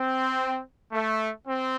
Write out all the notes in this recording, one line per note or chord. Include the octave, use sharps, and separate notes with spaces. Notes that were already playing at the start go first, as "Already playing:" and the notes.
Already playing: C4
A3
C4